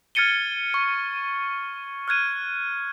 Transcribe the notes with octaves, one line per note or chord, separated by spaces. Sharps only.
F6 G#6 A6 C#7 D#7 G7
C#6
F6 F#6 G#6 D#7